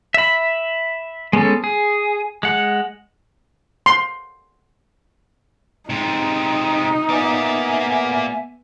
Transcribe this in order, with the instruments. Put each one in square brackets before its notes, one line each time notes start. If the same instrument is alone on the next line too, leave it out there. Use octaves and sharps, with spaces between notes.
[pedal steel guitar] E5 B5
G#3 B3 C#4 A4
G#4
G#3 F#5
[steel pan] C6
[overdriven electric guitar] C3 G#3 [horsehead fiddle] D#4
[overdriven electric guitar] A#3 D5 [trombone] B3 [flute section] E5 G#5